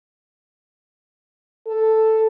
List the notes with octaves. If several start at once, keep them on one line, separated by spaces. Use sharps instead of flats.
A4